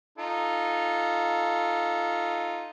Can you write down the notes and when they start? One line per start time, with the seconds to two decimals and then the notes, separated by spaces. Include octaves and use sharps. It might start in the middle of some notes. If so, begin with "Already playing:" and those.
0.18 D#4 F4 A4